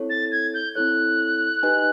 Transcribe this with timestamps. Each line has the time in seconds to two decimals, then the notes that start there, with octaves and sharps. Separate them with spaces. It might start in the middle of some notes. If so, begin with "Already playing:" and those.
Already playing: C4 E4 A4 C#5
0.10 A6
0.32 G#6
0.54 G6
0.75 C4 E4 A4 C#5 F#6
1.63 D#4 G4 B4 D#5 G#5